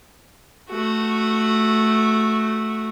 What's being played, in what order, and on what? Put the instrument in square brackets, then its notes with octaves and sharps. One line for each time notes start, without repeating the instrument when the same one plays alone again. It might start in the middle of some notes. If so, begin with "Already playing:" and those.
[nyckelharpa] A3 F#4